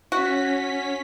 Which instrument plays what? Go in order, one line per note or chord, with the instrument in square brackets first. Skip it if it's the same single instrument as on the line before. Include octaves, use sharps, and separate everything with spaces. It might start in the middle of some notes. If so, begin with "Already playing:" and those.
[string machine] C#4 B6 [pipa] F#4